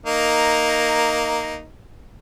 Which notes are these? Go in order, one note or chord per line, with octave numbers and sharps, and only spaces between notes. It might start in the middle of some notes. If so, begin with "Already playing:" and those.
A#3 D#4